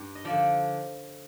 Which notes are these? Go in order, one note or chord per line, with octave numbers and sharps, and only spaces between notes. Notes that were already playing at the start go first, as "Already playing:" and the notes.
Already playing: G2
D#5
D3 F3 D5